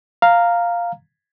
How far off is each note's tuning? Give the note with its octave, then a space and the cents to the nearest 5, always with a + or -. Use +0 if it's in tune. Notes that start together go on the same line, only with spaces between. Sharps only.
F5 +0 A#5 -10